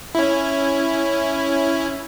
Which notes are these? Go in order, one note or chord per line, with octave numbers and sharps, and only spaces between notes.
C#4 E4